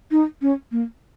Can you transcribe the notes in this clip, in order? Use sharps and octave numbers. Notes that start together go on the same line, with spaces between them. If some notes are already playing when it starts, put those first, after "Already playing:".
D#4
C#4
A#3